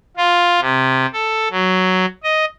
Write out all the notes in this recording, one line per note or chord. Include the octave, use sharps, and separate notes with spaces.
F4
C3
A4
F#3
D#5